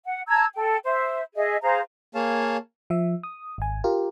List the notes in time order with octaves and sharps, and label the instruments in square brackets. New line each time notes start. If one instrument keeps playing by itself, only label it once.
[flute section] F#5
A5 A#5 E6 G#6
A4 G5
C5 E5
G#4 D#5 E5
G#4 C5 F5 A#5
[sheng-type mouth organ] A#3 G#4 C#5 F5 A5
[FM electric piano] F3 E5
D#6
G#1 G#5
F4 G4 A#4